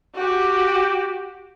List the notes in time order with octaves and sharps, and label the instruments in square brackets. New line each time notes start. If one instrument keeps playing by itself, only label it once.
[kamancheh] F#4 G4